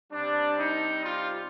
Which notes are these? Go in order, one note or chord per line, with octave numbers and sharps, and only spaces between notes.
C3 G3 C4 D4
D#4
F4